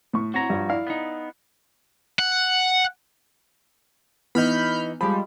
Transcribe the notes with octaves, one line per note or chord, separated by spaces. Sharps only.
A2 C#6
C4 E4 F#4 C#5 A#5
G2 F3
E4 D5 F5
B3 D#4
F#5
E3 B3 D#4 B5 F6 G6
F3 G3 G#3 B5